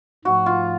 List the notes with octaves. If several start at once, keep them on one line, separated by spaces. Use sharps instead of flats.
G#2 F3 A3 F#4
F4